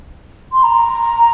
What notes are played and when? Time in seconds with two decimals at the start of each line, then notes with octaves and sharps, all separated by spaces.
0.52 C6
0.63 A#5